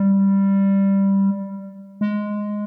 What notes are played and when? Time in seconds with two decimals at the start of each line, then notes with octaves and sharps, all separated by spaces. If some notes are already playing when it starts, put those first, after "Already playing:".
Already playing: G3
2.01 G#3